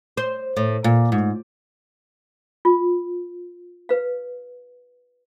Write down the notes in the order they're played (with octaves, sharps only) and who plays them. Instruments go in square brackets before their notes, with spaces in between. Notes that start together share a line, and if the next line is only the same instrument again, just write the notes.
[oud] C5
A2
A#2
G#2
[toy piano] F4
B4 F5